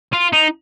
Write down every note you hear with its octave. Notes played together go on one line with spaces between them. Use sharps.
F4
D#4